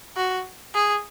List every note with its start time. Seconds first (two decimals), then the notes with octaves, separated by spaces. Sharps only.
0.17 F#4
0.74 G#4